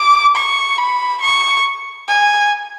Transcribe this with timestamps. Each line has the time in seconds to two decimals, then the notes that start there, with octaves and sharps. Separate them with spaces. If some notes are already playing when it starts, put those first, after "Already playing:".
Already playing: D6
0.36 C#6
0.78 B5
1.21 C#6
2.08 G#5